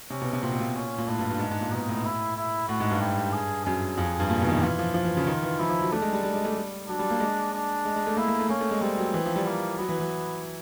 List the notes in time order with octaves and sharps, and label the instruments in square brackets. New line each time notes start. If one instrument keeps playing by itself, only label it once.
[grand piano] C3 [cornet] C#4
[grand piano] B2
C3
[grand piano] A#2 [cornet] C4
[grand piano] B2
A#2
[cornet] C#4
[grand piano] A#2
[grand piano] A2 [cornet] D4
[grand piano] G2
G2
G#2
G#2
A#2
[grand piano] B2 [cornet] D#4
[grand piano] A2
[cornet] E4
E4
[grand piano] A2 [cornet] F#4
[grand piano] G#2
G2
[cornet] G4
G#4
[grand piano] F#2 [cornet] G#4
[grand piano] F2
G2
A#2
B2
D#3
E3
[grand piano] E3 [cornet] F4
[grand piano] F3
F3
E3
C#3
D#3
E3
[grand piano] F3 [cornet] E4
[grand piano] F3
F#3
[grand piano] A3 [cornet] D4
[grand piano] G#3
G3
G3
G#3
A3
G3
[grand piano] F#3 [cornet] D4
[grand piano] G3
A#3
G#3
[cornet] D4
[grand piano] G#3
G#3
A3
[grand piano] A#3 [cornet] E4
[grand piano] A#3
A3
[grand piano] A#3 [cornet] C#4
[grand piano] A3
G#3
[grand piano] G3 [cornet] C4
[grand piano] F#3
E3
F3
G3
[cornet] A#3
[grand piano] F#3 [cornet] B3
[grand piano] E3
E3